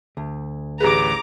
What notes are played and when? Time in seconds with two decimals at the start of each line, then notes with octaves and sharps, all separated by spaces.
0.17 D2
0.80 A1 G4 G#4 B4 A#5 D6